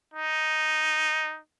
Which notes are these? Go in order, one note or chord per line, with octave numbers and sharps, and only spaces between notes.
D#4